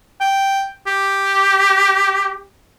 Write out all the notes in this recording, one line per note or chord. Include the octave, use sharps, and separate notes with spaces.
G5
G4